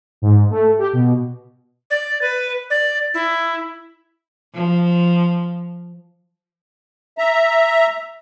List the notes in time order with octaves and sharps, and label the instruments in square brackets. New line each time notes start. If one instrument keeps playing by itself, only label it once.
[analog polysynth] G#2
A3
G4
B2
[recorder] D5
B4
D5
E4
[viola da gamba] F3
[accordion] E5 A#5